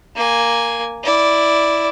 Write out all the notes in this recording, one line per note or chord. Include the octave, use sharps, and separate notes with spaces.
A#3 G#5
E4 D5